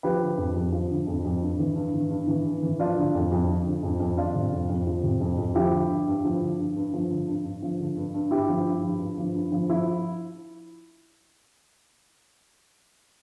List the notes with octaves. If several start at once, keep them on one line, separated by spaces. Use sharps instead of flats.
F3 G4 B4
D3
F2
F2
F3
D3
F2
F2
G2
E3
G2
E3
G2
E3
G2
E3
F3 D4 F4
D3
F2
F2
F3
D3
F2
F2
F3 D4 F4
C3
F2
F2
F3
C3
F2
F2
F3 E4 G4
D3
G2
G2
F3
D3
G2
G2
F3
D3
G2
G2
F3
D3
G2
G2
G2 E4 G4
F3
G2
F3
G2
F3
G2
F3
F3 E4